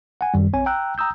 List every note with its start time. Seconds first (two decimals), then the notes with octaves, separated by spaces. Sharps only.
0.21 F#5 G#5
0.34 F#2 D#3 G3
0.53 A#1 C4 C#5 G#5
0.66 G5 A#5 E6 F#6
0.98 G5 A#5 D#6 E6 G6